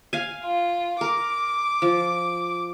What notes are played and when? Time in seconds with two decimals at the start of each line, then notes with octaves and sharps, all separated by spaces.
0.13 F5 G#5
0.44 F4
1.01 A#4 D6
1.82 F3